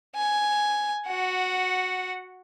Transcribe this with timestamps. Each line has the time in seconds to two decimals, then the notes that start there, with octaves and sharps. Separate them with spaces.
0.15 G#5
1.06 F#4 F#5